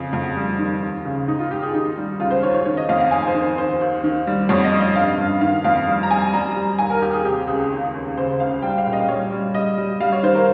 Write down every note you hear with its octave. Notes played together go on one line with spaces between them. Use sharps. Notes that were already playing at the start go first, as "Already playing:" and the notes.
Already playing: F2 C#3
F2
G3
D#3
D#2
C#3
G#2 D#4
F4
G#2 G4
G#4
D#3 D#4
G3
C#2 F4
C5
D#3 C#5
C#5
D#3 C#5
D#5
F2 F5
F5
G#2 G#5
C5
D#3
D#2 C5
D#2
D#3
G3
F2 C#5
D#5
G3
D#5
G2 F5
G2
D#3 F5
F2 F5
G3
A#5
G3 G#5
G3 A#5
G3
D#2 G#5
A#4
D#2 G4
G#4
C3 G4
C#2 G#4
D#2
D#2
C#3 C5
C#2 F5
G3 G5
F5
A#2
D#5
G3 C#5
G3
G3 D#5
G3
G3 F5
C#5
D#3 C5
A#4